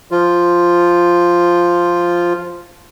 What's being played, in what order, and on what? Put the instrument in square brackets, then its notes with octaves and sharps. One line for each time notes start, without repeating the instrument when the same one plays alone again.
[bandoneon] F3 F4